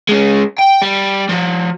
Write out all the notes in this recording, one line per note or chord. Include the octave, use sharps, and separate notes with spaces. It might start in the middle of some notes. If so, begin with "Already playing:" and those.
G#3 C#4
G5
G3
F3 F#4